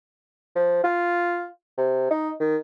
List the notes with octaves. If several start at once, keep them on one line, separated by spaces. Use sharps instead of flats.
F3
F4
C3
D#4
D#3